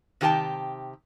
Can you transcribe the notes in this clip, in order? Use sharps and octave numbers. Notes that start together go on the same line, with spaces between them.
C3 D#3 G4 G#4 G5 A5